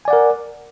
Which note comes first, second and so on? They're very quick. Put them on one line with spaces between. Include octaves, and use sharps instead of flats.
G#5 D5 F#5 A#4